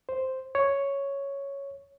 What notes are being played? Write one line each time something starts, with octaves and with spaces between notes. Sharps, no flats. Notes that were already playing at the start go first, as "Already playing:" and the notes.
C5
C#5